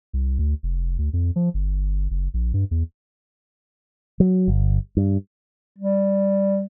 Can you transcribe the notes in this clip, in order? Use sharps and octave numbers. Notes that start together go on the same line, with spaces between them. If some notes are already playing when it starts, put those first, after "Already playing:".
C2
D2
F1
D2
F2
F3
G1
F#1
A#1
G2
E2
F#3
G1
G2
G3